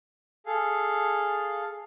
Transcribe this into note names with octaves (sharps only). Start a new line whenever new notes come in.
G#4 A4 F5